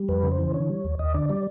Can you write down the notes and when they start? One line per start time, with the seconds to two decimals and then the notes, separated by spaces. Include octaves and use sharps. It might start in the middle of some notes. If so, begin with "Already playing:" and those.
Already playing: G3
0.09 F2 B4
0.23 C#3
0.32 C5
0.38 E3
0.54 D3 C#5
0.69 G3
0.84 D#2
0.99 D#2 D#5
1.14 D3 D5
1.29 G3 D5